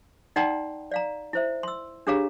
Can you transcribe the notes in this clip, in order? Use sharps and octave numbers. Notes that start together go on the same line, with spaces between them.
D#4 D5 F#5 G5 A#5 C6
D5 F5 A#5
E4 C5 E5
C6 E6
D4 G4 G#4 C#5 F5 A#5